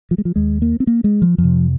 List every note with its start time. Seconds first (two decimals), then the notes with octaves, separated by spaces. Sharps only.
0.11 F3
0.18 G#3
0.25 F3
0.36 D#2 G#3
0.62 A#3
0.80 C4
0.87 A#3
1.04 G#3
1.22 F3
1.38 F2 F3
1.44 C3